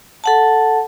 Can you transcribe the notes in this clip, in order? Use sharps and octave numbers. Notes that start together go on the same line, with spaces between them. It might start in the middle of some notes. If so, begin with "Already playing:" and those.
A4 F#5 A5